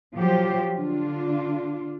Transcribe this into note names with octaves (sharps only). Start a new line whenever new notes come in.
F3 F#3 F4 G4 C5
D3 D4 F4